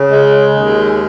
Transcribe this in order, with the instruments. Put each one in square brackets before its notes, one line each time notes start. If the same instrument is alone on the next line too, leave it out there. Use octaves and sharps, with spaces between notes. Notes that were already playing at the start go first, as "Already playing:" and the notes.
Already playing: [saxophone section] C#3
G#3
D#2